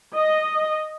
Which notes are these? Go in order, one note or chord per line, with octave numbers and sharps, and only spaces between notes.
D#5